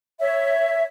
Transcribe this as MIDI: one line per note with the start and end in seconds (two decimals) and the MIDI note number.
0.19 0.84 73
0.19 0.84 76